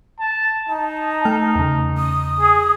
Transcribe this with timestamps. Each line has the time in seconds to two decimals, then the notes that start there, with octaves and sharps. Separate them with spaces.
0.20 A5
0.69 D#4 A5
1.25 A3 G5 F6
1.56 E2 C#3
1.97 D#6
2.40 G#4